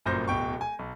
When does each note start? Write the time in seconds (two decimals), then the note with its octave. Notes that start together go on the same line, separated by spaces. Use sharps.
0.06 G1 F#2 A#2 C5 G6 A#6
0.28 D1 B2 G5 C#6
0.61 G#5
0.79 B1